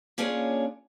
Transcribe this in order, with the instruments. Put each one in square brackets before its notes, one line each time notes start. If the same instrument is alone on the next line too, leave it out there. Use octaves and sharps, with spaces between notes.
[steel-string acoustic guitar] A#3 C#4 D4 F4 G#4 C#5